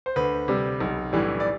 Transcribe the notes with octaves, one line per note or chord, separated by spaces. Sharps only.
C5
D2 B4
C3 G3
B1
A2 E3 G3
D5